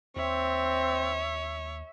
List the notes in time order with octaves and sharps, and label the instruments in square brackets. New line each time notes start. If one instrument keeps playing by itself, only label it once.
[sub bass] D#2 [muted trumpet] C4 [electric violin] C#5 [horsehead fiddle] E5